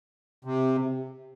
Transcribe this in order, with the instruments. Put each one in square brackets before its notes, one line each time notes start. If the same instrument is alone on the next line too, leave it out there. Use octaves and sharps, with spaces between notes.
[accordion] C3